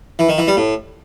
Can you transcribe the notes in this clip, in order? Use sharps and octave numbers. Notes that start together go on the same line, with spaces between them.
E3
D#3
E3
G3
A2